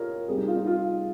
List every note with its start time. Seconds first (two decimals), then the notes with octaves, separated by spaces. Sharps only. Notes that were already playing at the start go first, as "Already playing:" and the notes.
Already playing: F4 G4 A#4 C#5 D#5
0.28 C3 G3 C4 G#4
0.38 D#4
0.47 F4
0.56 D#4
0.66 F4